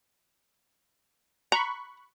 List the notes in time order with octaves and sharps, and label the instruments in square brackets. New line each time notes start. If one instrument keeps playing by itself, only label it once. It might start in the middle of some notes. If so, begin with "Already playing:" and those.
[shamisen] A#5 [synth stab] B5 C#6 F#6